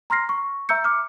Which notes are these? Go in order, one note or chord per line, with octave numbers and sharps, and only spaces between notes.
A#5 C6 F6 A#6 C7
C#6
E5 A#5 E6 G6 C#7
D6 F6